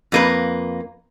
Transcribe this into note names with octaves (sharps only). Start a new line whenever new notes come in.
F2 A#3 B4